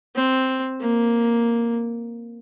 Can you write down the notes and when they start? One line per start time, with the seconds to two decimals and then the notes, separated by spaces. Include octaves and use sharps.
0.15 C4
0.81 A#3